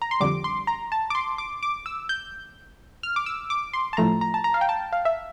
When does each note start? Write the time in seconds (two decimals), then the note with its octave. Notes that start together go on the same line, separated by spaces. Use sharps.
0.02 A#5
0.11 C6
0.20 F2 D3 G3 D6
0.44 C6
0.67 A#5
0.92 A5
1.10 D6
1.15 C6
1.38 D6
1.63 D6
1.86 E6
2.09 G6
3.03 F6
3.16 D6
3.26 E6
3.50 D6
3.73 C6
3.93 A5
3.97 A2 F3 A3 A#5
4.21 A#5
4.34 A5
4.44 A#5
4.54 F5
4.61 G5
4.69 A5
4.93 F5
5.05 E5